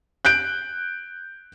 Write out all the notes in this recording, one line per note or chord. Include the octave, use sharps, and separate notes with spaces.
F#6 G6 D7